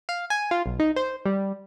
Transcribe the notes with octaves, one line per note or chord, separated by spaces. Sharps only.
F5
G#5
F4
B1
D#4
C5
G3